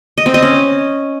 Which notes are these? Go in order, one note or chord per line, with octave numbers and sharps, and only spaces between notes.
D#5
C4
D#5
C#4